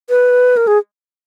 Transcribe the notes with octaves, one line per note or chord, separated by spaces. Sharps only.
B4
A#4
G#4